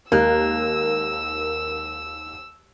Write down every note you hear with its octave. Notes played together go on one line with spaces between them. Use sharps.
D#2 G#3 A#3 A#4 E6 F#6